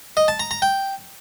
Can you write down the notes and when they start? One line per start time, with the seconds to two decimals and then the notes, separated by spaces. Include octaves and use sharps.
0.17 D#5
0.28 A5
0.40 A#5
0.51 A#5
0.62 G5